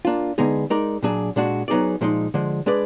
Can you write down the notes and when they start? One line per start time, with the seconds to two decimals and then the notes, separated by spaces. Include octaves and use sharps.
0.05 A#3 D4 F4
0.38 D3 G#3 B3 D#4 G#4
0.70 G#3 D#4 A#4 D5
1.03 A#2 F#3 D4 G#4
1.36 A#2 G#3 D4 F#4
1.68 F#3 B3 D#4 G#4 D5
2.01 A#2 F3 G#3 D#4
2.34 D3 F3 G#3
2.66 G#3 D4 G#4 B4 D5